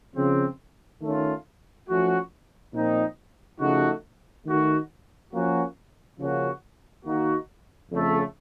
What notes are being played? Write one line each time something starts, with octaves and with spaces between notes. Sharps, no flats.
C#3 F3 C4
D#3 A3 C#4 F4
F3 A3 C#4 F#4
A#2 F3 C4 D#4
C#3 F3 A3 D#4 F#4
D#3 A3 D#4 F#4
F3 A#3 C#4 F#4
C#3 F3 A#3 C#4 F#4
D#3 A#3 D#4 F#4
F2 C#3 A3